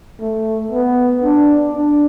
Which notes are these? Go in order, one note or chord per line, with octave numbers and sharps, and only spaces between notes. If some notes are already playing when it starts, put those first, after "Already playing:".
A3
B3
D4
D4